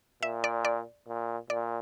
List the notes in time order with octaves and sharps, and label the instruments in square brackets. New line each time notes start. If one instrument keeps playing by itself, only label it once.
[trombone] A#2 [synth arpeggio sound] E5
[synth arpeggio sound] D5
D5
[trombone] A#2
[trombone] A#2 [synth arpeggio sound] D5